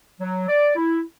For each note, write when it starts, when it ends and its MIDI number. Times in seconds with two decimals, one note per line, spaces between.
0.21 0.44 54
0.48 0.73 74
0.76 1.01 64